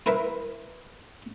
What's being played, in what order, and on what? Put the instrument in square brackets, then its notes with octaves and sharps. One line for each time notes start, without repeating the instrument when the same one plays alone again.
[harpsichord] E4 A#4 B4 E5